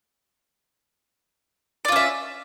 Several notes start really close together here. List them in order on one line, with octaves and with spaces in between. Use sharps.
D5 F4 C#4 E5